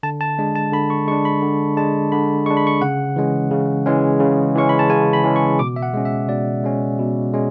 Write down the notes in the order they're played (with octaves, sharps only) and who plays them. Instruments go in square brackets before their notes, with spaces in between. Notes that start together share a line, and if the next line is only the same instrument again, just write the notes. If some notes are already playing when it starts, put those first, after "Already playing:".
[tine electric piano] D3 A5
A5
G#3 D4
A5
D3 B5
C#6
G#3 C#6
D4
B5
D3
G#3 D4 A5
D3 B5
G#3 D4 C#6
B5
C#6
C#3 F#5
E3 G#3 C#4
C#3
E3 G#3 C#4
C#3
E3 G#3 C#4 C#6
B5
A5
C#3 G#5
B5
E3 G#3 C#4
C#6
B2 D6
E5
F#5
G#3 C#4
E5
B2 D5
G#3 C#4
B2
G#3 C#4